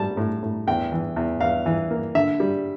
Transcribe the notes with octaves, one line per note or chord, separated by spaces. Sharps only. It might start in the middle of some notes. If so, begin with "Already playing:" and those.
Already playing: A2 G3 A5
A2
A2
E2 G5
E3
E2
E2 F5
E3
A#3
D3 E5
G3